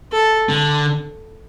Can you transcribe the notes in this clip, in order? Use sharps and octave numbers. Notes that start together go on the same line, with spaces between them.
A4
D3